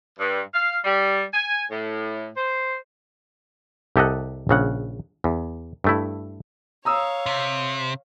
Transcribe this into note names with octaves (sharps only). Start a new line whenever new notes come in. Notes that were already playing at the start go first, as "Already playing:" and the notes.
G2
F5
G3
G#5
A2
C5
C2 G4 A4 D#5 F#5
A#1 C#3 F#5
E2
G2 A3 E4
C#5 F5 A#5 D#6 E6
C3